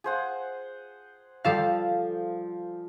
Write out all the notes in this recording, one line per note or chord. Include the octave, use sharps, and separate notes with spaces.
G#4 C5 F#5
F3 G3 A4 F5